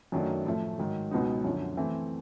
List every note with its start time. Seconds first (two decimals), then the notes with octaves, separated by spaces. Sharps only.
0.12 F#2 D#3 F#3 A3 D4
0.45 A2 F3 A3
0.78 G#2 D#3 F#3
1.11 C#2 B2 F#3 B3 D#4
1.44 F#2 D3 F3
1.77 E3 A3 C4